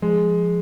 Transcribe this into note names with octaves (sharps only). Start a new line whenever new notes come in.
F3 G#3